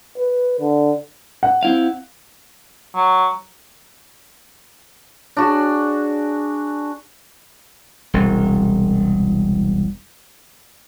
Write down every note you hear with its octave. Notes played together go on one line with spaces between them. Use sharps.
B4
D3
F#5
C4 E4 F5
F#3
D4 F#4 G#4
E1 C2